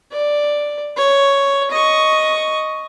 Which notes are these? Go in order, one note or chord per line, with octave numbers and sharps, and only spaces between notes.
D5
C#5
D#5 C#6